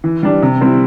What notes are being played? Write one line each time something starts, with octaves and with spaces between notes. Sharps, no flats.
E3
G3 D4
C3
G3 C4 E4